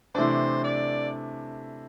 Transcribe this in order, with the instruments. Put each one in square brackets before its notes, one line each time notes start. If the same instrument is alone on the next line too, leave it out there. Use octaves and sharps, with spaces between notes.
[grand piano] C3 E3 A3 D4 [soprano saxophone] C5
[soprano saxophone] D5